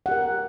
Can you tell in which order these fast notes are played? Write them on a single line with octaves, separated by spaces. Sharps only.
F#5 G4 A#4